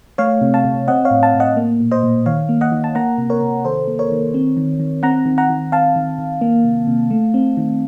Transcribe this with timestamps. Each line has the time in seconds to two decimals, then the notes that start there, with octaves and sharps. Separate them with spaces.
0.18 A3 C#5 F5
0.41 C3
0.54 F5 A5
0.65 C3
0.88 C4 D#5 F#5
1.05 C#5 F5
1.11 A2
1.23 F5 A5
1.35 A2
1.40 D#5 F#5
1.57 A#3
1.80 A#2
1.91 C5 D#5
2.03 A#2
2.26 D#3 C#5 F5
2.49 A#3
2.61 D#5 F#5
2.72 D#3
2.84 A5
2.95 A#3 F#5 A#5
3.18 C3
3.30 A#4 C#5
3.41 C3
3.65 D#3 A4 C5
3.88 A#3
3.99 A#4 C#5
4.11 D#3
4.34 C4
4.57 D#3
4.80 D#3
5.03 C4 F#5 A#5
5.26 D#3
5.38 F#5 A#5
5.50 D#3
5.72 C4 F5 A5
5.96 D#3
6.18 D#3
6.41 A#3
6.64 C3
6.87 C3
7.10 A3
7.34 C4
7.57 D#3